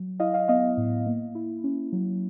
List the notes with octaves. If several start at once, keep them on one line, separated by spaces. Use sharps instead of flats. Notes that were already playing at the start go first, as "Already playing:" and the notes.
Already playing: F#3
E4 D#5 F5
D#5 F5
B3 D#5 F5
A2
A#3
E4
C#4
F#3